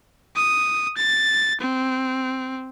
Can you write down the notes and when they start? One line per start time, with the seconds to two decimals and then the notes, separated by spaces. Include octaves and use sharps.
0.36 D#6
0.97 A6
1.61 C4